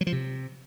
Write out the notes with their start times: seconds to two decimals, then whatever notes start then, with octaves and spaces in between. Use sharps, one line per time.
0.01 F#3
0.07 F3
0.12 C3